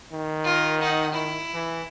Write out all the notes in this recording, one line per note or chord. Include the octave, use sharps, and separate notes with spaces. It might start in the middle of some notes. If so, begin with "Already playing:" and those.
D#3
F4 A#4
D#4 F#5
E4
E3